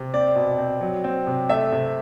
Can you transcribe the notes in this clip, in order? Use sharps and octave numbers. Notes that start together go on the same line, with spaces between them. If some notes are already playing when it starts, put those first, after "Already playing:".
Already playing: C3
C4 D5
B2
C4
F#3
C4
C3
A3 E5
C3